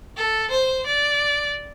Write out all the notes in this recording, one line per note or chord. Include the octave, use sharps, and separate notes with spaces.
A4
C5
D5